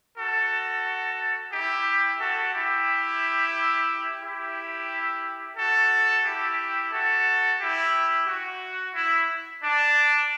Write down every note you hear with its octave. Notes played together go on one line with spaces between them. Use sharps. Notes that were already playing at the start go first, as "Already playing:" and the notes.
F#4 A4
E4 G4
F#4 A4
E4 G4
E4 G4
F#4 A4
E4 G4
F#4 A4
E4 G4
F#4
E4
D4